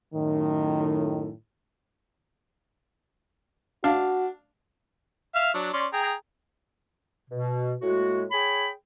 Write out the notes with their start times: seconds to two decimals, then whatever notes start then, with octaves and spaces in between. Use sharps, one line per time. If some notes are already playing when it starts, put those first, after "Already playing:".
0.14 F#2 A2 D#3
3.84 D4 F#4 F5
5.35 E5 F5 F6
5.54 F#3 D4
5.73 C#4 D5 C6
5.93 G#4 G5 A#5
7.30 B2
7.82 A2 G#3 A#3 F#4
8.32 G#4 C#5 G5 B5